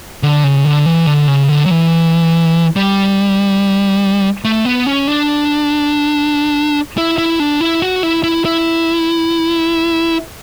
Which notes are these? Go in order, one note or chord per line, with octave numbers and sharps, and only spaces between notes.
D3
C#3
D3
E3
D3
C#3
D3
F#3
E3
G3
A3
B3
C#4
D4
E4
E4
D4
E4
F#4
E4
E4
E4